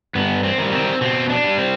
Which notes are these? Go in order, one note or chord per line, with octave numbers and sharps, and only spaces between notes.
G2 B3
C4
D#3 G3
C4
B2 C4
D4
G3
C4